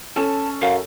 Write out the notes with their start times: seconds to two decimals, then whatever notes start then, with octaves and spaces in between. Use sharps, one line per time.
0.16 C#4 A4 A5
0.61 F#2 F5